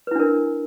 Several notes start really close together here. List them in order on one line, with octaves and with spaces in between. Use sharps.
B4 E4 D4 A#4